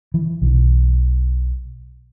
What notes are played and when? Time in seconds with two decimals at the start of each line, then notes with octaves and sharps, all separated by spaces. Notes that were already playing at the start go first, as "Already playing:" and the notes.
0.14 E3
0.41 B1